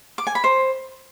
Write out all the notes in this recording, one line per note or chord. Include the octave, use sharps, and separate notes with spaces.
D6
G#5
B5
C5